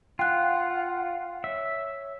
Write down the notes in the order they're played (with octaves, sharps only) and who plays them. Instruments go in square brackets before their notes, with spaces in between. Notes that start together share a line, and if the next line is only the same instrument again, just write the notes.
[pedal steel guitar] F4 [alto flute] F#5 [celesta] G5 F#6
[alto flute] C#5 [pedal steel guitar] E5